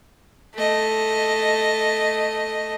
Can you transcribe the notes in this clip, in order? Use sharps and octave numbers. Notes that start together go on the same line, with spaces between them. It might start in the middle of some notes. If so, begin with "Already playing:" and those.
A3 D#5